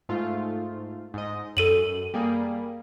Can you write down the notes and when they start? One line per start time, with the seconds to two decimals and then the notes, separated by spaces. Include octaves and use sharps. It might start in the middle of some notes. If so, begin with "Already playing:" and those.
0.09 G#2 A3 F4
1.14 G#2 D#5
1.57 F#2 A4 D#7 F#7
2.14 G3 A#3 G#4